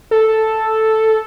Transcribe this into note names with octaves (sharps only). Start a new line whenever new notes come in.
A4